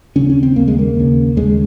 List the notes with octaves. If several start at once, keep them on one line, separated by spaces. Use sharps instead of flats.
D#2 C#3 C#4
C#4
C4
D#2 C#3 A#3
G#3
A#3
D#2 C#3
D#2 C#3 G#3